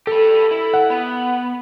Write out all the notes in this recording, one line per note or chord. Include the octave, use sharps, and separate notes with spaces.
G4 A4 B4
E4
F#5
B3